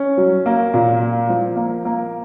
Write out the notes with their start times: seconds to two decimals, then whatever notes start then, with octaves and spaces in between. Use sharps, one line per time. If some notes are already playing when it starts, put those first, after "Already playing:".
Already playing: C#4
0.17 F#3
0.46 A#3
0.74 A#2
1.01 A#3
1.29 F3
1.56 A#3
1.85 A#3